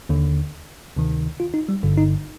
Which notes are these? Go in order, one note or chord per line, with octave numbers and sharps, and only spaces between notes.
D#2 D3
D2 C3 D#3
F4
D#4
G3
G1 G2 D3
D#4